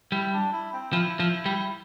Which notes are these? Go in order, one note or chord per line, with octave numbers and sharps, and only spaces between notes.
G3 E4
D4
E4
C4
F3 E4
F3
G3